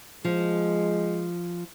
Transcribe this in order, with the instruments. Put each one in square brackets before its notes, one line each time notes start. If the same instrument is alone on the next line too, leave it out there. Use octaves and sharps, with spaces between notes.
[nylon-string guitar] F3 [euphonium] G#3